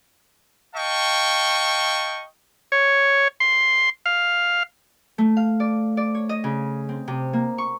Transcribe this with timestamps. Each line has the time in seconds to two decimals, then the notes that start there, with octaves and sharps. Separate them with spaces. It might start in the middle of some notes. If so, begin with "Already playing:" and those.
0.75 D#5 F5 G5 A5 C#6
2.72 C#5
3.40 C6
4.06 F5
5.18 A3
5.37 F5
5.60 D5
5.97 D5
6.15 C#5
6.29 D#5
6.44 C#3
6.89 C4
7.08 C3
7.33 A#3
7.58 C#6